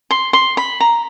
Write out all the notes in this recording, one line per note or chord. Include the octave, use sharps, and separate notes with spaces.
C6
C6
B5
A#5